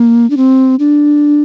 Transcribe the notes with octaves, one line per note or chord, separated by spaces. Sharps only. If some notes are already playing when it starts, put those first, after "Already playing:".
Already playing: A#3
D4
C4
D4